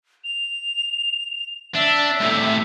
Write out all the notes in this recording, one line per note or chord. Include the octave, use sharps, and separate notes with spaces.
F7
D4 E5
A2 C3